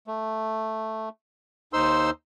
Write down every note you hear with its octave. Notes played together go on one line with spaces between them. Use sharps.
A3
D#2 D#4 C5 C6 E6